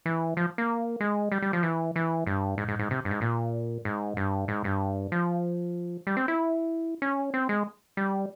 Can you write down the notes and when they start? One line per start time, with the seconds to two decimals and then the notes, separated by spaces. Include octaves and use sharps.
0.06 E3
0.37 F3
0.58 A#3
1.00 G#3
1.32 G3
1.42 G3
1.53 F3
1.63 E3
1.96 E3
2.26 G2
2.58 G#2
2.68 G#2
2.79 G#2
2.91 C3
3.05 G2
3.11 G#2
3.21 A#2
3.85 G#2
4.17 G2
4.48 G#2
4.64 G2
5.12 F3
6.07 G3
6.17 C4
6.28 E4
7.02 C#4
7.34 C4
7.49 G#3
7.97 G3